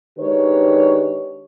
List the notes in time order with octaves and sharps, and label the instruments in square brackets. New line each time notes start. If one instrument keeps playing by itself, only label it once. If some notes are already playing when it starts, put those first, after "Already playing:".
[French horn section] D#3 G#3 D4 G4 B4 C#5